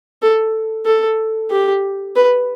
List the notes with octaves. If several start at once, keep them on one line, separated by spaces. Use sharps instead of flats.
A4
A4
G4
B4